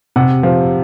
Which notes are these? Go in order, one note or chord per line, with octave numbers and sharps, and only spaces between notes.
C3 F#5
F3